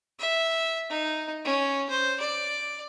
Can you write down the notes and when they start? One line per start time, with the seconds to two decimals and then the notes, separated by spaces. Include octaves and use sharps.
0.19 E5
0.90 D#4
1.45 C#4
1.90 C5
2.20 D5